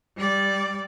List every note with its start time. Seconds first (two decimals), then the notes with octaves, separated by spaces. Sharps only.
0.17 G3 D5